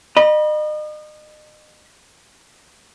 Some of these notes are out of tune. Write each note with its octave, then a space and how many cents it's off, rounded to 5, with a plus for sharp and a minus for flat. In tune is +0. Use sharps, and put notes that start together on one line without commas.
D#5 -35 B5 -35